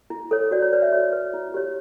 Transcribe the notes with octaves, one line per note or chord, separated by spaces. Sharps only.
E4
A4 C#5
F#4 D5
C#5
B4 D5
E5
F#4 C#5
B4
E4
G4 C#5